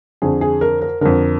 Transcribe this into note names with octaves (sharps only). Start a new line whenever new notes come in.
F2 D3 G#4
G#4
A#4
A#4
F2 D3 A#4